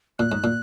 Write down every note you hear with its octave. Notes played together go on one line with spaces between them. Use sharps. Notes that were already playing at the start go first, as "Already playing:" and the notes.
A#2 F#6
G#2
A#2